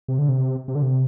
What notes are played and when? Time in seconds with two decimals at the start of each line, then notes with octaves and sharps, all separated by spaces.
0.08 C3
0.19 D3
0.29 C3
0.68 C3
0.75 D3
0.82 C3